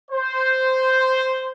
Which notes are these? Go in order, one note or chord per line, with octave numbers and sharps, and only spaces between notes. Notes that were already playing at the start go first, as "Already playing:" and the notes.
C5